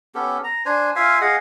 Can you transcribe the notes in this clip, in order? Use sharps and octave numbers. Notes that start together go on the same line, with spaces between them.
B3 C#4 G4 A4
A#5
D4 C5 G#5
F4 E5 F5 G#5
G#4 D#5 F5 F#5